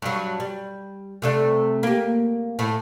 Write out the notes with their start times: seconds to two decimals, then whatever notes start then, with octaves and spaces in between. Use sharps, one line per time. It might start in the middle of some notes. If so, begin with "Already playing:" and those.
0.02 G2 F#3
0.40 G3
1.22 C3 A3 D4
1.83 A#3 G4
2.59 A2 A3